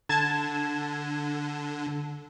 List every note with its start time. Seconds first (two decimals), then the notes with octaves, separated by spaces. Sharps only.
0.09 D3 A5 G#6 E7